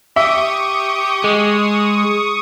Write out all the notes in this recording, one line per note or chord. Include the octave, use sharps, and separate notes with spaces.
G4 E5 C#6 D#6
G#3